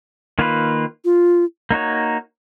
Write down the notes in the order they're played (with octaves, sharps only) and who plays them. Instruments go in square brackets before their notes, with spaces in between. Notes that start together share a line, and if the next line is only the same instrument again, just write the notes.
[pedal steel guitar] D#3 A#3 F4 B4
[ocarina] F4
[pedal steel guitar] A#3 D#4 F#4 C#5